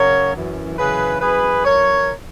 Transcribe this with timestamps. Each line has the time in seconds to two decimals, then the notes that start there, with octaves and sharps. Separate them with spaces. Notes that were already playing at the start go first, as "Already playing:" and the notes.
Already playing: F#2 C#3 F#3 A#4 C#5
0.33 F#2 E3
0.77 F#2 C#3 E3 G#4 B4
1.20 F#2 E3 G#4 B4
1.64 F#2 E3 A#4 C#5